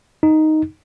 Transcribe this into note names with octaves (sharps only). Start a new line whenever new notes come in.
D#4